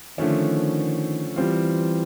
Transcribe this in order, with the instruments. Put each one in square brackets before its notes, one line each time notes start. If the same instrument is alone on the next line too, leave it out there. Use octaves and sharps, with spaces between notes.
[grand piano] D3 F3 A3 C#4 [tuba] D#3
[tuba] E3 [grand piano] G3 C4 F4